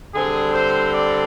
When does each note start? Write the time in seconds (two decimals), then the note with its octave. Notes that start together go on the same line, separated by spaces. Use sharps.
0.14 D3 G3 C4 G#4
0.53 C5
0.93 D5